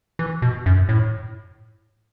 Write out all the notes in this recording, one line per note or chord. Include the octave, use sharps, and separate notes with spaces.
E3
B2
F#2
A2